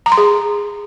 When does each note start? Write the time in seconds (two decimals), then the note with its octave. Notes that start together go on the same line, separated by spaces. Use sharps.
0.06 A#5
0.12 C6
0.18 G#4